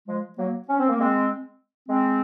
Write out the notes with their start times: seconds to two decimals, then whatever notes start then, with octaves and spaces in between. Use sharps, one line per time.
0.07 F3 G#3
0.37 F#3 A#3
0.67 C#4
0.78 C4
0.89 A#3
0.99 G#3 C4
1.88 G#3 C4